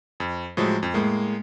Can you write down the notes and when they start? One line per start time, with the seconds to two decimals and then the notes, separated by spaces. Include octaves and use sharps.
0.20 F2
0.57 A2 F3 F#3 G#3
0.83 F2
0.94 A2 G#3 A#3